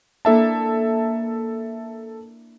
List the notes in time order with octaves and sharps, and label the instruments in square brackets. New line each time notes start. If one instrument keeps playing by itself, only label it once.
[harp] A#3 D4 E4 [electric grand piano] A4 E5 A5